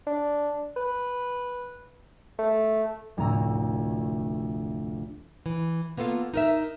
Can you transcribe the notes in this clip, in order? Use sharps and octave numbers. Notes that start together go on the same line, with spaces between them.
D4
B4
A3
F1 D2 A2 D4 A#5 E6
E3
A#3 B3 F4 A4 F5
D#4 A#4 E5